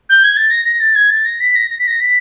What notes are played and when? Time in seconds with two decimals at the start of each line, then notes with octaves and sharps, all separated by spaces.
0.09 G6
0.23 G#6
0.36 A6
0.50 A#6
0.65 A#6
0.80 A6
0.95 G#6
1.09 A6
1.25 A#6
1.40 B6
1.55 A#6
1.70 A#6
1.78 B6
1.87 A#6
2.00 B6